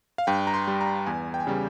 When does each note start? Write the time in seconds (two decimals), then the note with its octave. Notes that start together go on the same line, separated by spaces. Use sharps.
0.18 F5
0.27 G2 G5
0.47 A#5
0.54 C6
0.67 G3
0.81 A#5
1.07 E2 G#5
1.34 G5
1.40 G#5
1.47 C#3 G3 G5